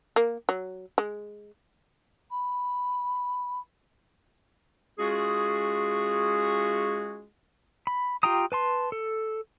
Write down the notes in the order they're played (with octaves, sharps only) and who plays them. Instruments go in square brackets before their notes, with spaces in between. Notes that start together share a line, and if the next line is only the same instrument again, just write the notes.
[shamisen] A#3
F#3
G#3
[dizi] B5
[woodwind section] G#3 C#4 F4 F#4 G#4
[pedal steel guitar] B5
F4 G4 G5 A#5 D#6
B4 A5 C6
A4